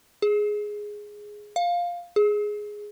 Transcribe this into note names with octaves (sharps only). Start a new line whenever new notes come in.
G#4
F5
G#4